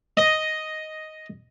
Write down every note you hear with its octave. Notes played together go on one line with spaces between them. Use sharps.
D#5